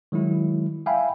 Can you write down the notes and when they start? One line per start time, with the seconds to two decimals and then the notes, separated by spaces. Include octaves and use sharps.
0.12 D#3 F#3 G#3 E4
0.86 E5 F5 G5 G#5 B5